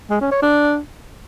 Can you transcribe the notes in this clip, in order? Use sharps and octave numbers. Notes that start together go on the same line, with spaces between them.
G#3
C#4
C#5
D4